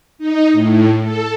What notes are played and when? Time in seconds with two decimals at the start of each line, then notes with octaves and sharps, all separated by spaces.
0.18 D#4
0.53 A2
1.02 A4